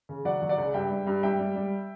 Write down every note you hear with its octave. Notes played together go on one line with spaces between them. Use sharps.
C#3
F#3 D5 F#5
F#3
D5 F#5
C#2
G2 E5 G5
G3
G2
G3 E5 G5
G3
G3